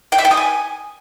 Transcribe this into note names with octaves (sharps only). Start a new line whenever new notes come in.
G5
E5
G5
D#6
G#5